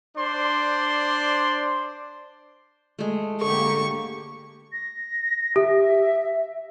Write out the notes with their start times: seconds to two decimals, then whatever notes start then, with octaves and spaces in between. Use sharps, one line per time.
0.17 D4 C5 D5 C6
2.99 G#3 A3
3.42 D3 A#3 G4 A4 C#6
4.72 A#6
5.56 G4 E5